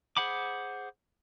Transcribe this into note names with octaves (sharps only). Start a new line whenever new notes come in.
G#4 C5 F#5 B5 D6